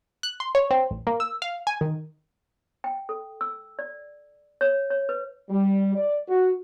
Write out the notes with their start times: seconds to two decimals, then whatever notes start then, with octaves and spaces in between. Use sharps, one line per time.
0.23 F#6
0.40 C6
0.55 C#5
0.71 C4
0.91 A1
1.07 A#3
1.20 E6
1.42 F5
1.67 G#5
1.81 D#3
2.84 G5
3.09 A4
3.41 E6
3.79 D5
4.61 C#5
4.90 C#5
5.09 B4
5.50 G3
5.96 D5
6.29 F#4